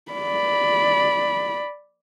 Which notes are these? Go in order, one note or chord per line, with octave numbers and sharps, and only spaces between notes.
D5 B5